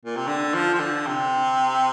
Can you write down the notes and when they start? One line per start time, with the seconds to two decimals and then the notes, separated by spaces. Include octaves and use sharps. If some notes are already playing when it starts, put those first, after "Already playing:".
0.05 A#2
0.16 C3
0.28 D3
0.54 F3
0.74 F3
0.80 D3
1.06 C3